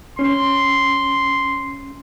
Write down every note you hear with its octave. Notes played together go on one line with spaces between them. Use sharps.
C#4 C6